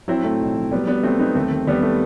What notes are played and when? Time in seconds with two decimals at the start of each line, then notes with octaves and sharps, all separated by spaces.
0.08 F#3 C4 E4
0.24 A2 A3 C4
0.40 B1
0.56 F#3
0.71 F#3 G3 B3
0.87 F#3 G3 B3
1.03 F#3 A3 C4
1.19 F#3 B3 D#4
1.35 D#2 A3 C4
1.51 D#3
1.67 D#2 G3 B3
1.83 A3